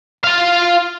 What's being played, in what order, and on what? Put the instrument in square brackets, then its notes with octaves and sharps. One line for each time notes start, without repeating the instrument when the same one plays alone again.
[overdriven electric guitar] F4 F5